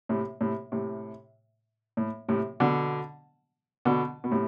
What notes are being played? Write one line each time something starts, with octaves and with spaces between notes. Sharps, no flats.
A2 C3
A2 C3
A2 C3
A2
A2 C3
B2 D3
B2 D3
B2
A2 C3